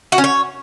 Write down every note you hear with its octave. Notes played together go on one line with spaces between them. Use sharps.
F#4
C#4
C#5